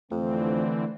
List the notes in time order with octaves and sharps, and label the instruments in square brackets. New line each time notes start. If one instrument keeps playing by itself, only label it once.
[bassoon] F2 [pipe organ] D3 E3 C4 [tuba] A3